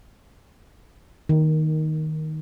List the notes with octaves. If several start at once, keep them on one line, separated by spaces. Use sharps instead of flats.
D#3